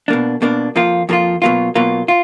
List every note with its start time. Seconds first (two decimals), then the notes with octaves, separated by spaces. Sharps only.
0.08 B2 A#3 D4
0.42 B2 A#3 D4
0.76 F2 F3 A#3 F4
1.09 F2 F3 A#3 F4
1.42 B2 F#3 A#3 F4
1.75 B2 F#3 A#3 F4
2.08 F4